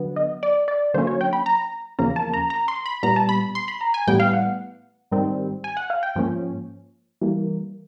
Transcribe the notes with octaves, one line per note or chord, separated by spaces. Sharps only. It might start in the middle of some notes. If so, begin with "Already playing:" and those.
Already playing: D3 F#3 B3
D#5
D5
D5
D3 F#3 A#3 C#4 C5
C#5
G5
B5
A#5
E2 C#3 F3 A#3 C#4 A#5
A5
A#5
A#5
C6
B5
A#2 G3 B3 A#5
A5
B5
C6
B5
A#5
G#5
A2 E3 G3 B3 G5
F5
F#5
G#2 D#3 G3 C4
G#5
F#5
F5
G5
G#2 F3 A#3 C#4
E3 G3 A#3